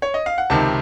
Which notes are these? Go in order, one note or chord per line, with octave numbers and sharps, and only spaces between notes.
C#5
D#5
F5
F#5
C#2 C3 D#3 A5